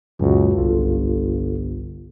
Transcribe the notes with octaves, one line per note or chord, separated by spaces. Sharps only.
C#2 F#2 A#2 F#4
G1 C2 F4 A4